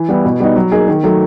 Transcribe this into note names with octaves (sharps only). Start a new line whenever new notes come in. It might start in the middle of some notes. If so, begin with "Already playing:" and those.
Already playing: E3
G3 B3 E4
B2
G3 B3 D#4
F#3
A#3 D#4 G#4
D#3
F#3 A3